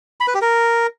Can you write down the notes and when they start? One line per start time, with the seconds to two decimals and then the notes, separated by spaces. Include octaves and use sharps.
0.20 B5
0.27 B4
0.34 G4
0.41 A#4